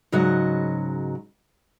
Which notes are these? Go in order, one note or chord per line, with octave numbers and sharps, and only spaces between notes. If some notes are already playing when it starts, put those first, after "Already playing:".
G#2 C#3 F#3 F#4 D#5